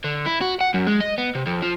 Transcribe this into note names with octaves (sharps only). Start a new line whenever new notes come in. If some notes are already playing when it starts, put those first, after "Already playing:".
D3
E4
F#4
F#5
F#2
G#3
D#5
B3
C3
F2
F3